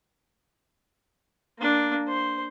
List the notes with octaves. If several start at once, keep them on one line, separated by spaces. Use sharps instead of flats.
A#3 D4
C5